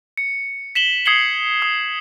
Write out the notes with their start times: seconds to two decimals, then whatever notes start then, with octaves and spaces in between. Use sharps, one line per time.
0.17 C#7
0.75 B6 E7 F#7 G7
1.06 D#6 G#6 C7 C#7 F#7 G7
1.62 D#6